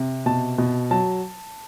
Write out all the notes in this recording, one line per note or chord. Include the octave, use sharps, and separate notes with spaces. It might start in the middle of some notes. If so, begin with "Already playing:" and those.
Already playing: C3
B2 A5
B2
F#3 A5